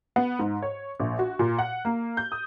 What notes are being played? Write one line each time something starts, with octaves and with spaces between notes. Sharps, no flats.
B3
G#2
C#5
A#1
F#4
A#2
F#5
A#3
G6
D#6